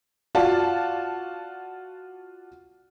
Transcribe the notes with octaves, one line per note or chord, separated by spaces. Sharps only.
F4 F#4 D5 A5